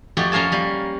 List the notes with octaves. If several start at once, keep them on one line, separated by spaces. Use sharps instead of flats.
F2 A3 F#4 G4
C#4 A#4 F5 G#5 A5
G3 A#3